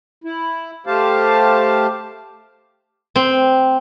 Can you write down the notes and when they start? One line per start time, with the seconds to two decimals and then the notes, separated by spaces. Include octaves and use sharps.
0.24 E4
0.87 A3 G4 C5 F5 A5
3.16 C4